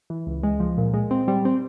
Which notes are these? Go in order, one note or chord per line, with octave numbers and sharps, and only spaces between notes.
E3
C#2
G#3
F3
A#2
G#3
C4
G3
C4